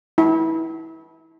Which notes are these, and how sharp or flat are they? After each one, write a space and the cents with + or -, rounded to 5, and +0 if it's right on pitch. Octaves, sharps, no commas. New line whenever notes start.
E4 -25